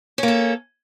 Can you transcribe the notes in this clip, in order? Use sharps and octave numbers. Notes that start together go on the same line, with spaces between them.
A#3 C#4 A4